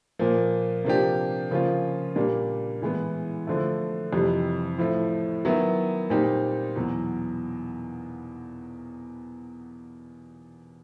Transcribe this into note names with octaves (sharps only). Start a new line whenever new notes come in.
A#2 F3 A#3
C3 F3 A#3 D4 G4
C#3 F3 A#3 C#4 F4
A#2 G3 A#3 D4
A2 E3 G#3 B3
D3 F3 A3
F2 C3 E3 G3
A2 F3 A3
D#3 F#3 B3 E4
A#2 G3 C4 D#4 G4
E2 B2 F#3